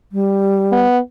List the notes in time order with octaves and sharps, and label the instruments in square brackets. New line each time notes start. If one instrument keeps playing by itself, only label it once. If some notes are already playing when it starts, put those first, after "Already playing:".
[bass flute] G3
[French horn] B3